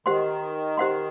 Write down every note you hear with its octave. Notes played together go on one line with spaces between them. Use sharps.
D#3 G4 C5 F#5 C6
G4 C5 F#5 C6